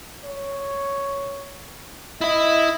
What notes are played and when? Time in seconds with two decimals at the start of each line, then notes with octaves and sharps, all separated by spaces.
0.24 C#5
2.21 E4 D#5 E5